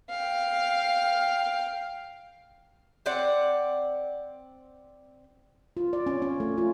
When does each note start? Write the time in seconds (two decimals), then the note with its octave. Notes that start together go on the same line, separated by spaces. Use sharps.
0.10 F5 G5
3.06 C4 D5 F#5
5.77 F4
5.93 D5
6.06 C#4
6.22 C#4
6.40 A3
6.58 F4